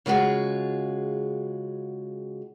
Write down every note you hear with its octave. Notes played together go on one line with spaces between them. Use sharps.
C#3 G#3 F4 F#4 G#4